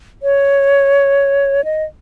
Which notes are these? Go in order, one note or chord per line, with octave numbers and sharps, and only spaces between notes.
C#5
D#5